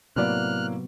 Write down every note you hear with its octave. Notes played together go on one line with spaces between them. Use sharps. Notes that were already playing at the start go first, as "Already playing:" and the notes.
A2 C3 F#3 A#3 B3 D5 F6 F#6